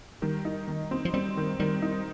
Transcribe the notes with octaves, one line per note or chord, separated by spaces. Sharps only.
D#3 G3
D#4
D#3
C4
F3
G3 C4
D#3
D#3 G3
D#4